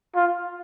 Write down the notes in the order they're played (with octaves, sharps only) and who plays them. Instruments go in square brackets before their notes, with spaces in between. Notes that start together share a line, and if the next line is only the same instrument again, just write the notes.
[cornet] F4